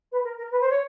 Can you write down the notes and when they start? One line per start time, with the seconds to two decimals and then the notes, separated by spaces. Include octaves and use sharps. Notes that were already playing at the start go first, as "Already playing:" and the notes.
0.11 B4
0.24 A#4
0.37 A#4
0.51 B4
0.60 C5
0.69 C#5